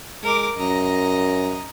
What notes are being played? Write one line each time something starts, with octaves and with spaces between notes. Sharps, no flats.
G#3 A#4 D6
F#2 D#5 A#5